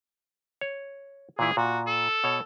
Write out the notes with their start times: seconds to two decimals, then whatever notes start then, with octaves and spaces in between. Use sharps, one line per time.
0.61 C#5
1.39 A#2 E3 E4 G#4
1.57 A#2 F#4
1.87 A4
2.24 B2 C#5